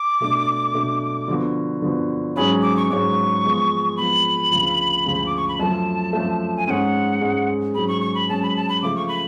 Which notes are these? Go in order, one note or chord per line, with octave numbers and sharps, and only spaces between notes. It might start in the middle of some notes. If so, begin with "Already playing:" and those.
Already playing: D6
B2 A3 D4
B2 A3 D4
D3 F3 B3 F#4
D3 F3 B3 F#4
G#2 F#3 C#4 G#4 C#5 B5
D6
C#6
G#2 F#3 C#4 G#4 C#5 C#6 D6
F3 G#3 B3
F3 G#3 B3 B5
D2 C#3 F3
D2 C#3 F3
D6
C#6
B5
F#2 F3 A3 A5
F#2 F3 A3
G#5
G#2 G#3 C#4 F#5 G#5
G#2 G#3 C#4
G#2 F#3 C#4 G#4 B5
C#6
C#6
B5
G#2 F#3 C#4 G#4 A5
B5
A5
B5
C#3 F3 A3 D6
C#6
B5